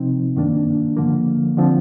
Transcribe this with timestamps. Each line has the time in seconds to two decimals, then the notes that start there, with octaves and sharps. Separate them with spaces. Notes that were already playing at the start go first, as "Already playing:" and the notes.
Already playing: C3 F3 C4 D#4
0.36 G2 D#3 A#3 D4
0.97 D3 F3 A#3
1.57 D3 F3 C4